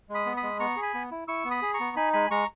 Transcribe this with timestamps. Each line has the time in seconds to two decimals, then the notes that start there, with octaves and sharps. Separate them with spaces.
0.09 G#3
0.14 B5 D#6
0.26 B3
0.37 B5 D#6
0.43 G#3
0.59 B3 A#5 C#6
0.76 G#4
0.82 G#5 B5
0.94 B3
1.11 E4
1.28 E4 C#6 E6
1.45 B3
1.50 B5 D#6
1.62 G#4
1.74 A#5 C#6
1.80 B3
1.96 D#4 G#5 B5
2.13 G#3 G#5 B5
2.31 G#3 A#5 C#6